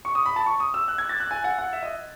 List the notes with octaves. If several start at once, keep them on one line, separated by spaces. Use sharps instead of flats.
C#6
D#6
B5
A5
C#6
D#6
E6
F#6
G#6
A6
F#6
G#5
F#5
F#5
E5
D#5